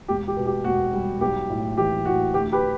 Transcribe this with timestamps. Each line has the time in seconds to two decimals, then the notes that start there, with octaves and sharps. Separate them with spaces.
0.08 E1 G4
0.28 G4
0.37 B2
0.46 G4
0.64 E1 F#4
0.93 G3
1.21 B1 G4
1.50 A2
1.77 E3 G4
2.05 A2 F#4
2.34 D2 G4
2.52 G4 B4